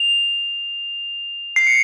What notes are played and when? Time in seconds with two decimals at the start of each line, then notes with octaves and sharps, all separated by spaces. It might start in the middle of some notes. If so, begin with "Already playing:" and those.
Already playing: F7
1.56 C7
1.67 C#7